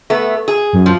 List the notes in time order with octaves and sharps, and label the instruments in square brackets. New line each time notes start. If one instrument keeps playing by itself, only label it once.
[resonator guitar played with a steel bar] A3 B3
G#4
[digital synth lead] F#2
[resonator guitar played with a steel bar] F3